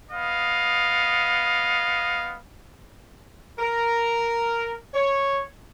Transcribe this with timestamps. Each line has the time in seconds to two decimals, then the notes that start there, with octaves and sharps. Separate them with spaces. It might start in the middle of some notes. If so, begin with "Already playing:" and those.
0.11 B3 D#5 F5
3.59 A#4
4.94 C#5